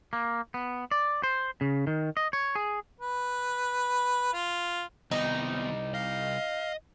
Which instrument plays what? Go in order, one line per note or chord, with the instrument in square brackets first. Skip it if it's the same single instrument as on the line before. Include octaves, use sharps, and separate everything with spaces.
[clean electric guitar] A#3
B3
D5
C5
C#3
D#3
D#5
C#5
G#4
[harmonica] B4
F4
[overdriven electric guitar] C2 G3 [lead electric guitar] D#3 B3 [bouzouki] D#4
[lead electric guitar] D#5 [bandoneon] F5